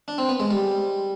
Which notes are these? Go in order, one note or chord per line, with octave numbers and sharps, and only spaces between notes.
D4
C4
B3
G#3
G3